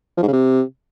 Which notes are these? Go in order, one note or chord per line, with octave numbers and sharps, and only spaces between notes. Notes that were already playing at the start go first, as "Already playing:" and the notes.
F3
G#2
C#3
C3